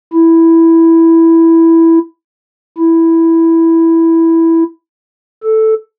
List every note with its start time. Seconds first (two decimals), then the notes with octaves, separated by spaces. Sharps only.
0.13 E4
2.78 E4
5.43 A4